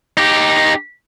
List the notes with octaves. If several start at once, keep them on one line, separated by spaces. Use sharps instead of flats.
D#4 G4